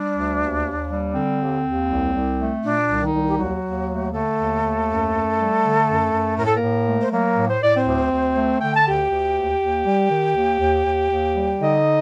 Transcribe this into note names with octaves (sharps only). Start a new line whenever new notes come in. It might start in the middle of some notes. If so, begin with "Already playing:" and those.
Already playing: G3 D4
D2
D#2
D#2
G3
D3 C4
D#2
D#2
C2
C2
A3
A#2 D4
C2
D#3 D#4
C2
G4
D#2 F#3 F#4
D#2
A3
D3 A3 A4
D#2
D#2
F#2
F#2
G3
D3
F#2
F#2
A2 A#4
A4
A#3 A#4
A2
A3
C5
F#3 A#3 A#4
A2
C5
A2 D5
C4 C5
D2
D2
A3
D3 G5
A5
D2 G4 G5
D2
D#2
D#2
G3
D#3
D#2
D#2
D#2
D#2
G3
D3 D#4 D#5